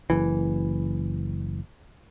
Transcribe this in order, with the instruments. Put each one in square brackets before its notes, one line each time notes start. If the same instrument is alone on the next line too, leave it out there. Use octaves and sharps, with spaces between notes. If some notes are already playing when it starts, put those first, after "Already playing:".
[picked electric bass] F#1 E3